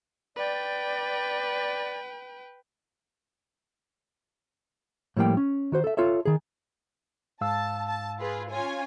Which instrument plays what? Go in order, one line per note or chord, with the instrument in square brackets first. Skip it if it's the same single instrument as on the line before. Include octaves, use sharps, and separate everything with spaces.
[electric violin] B4 G5 [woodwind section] D5
[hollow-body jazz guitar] A2 F3 G3 A#3 G5
C#4
D#3 F#4 C5
A4 E5
F4 A4 C#5 E5
D#3 G#4
[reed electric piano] G#2 F5 E6 [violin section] A5
[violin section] A5
F4 G#4 B4
C#4 F4 G#5